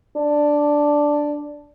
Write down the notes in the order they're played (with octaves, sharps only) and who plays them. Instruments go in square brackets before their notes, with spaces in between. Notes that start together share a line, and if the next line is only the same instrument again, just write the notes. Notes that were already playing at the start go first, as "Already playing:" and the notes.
[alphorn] D4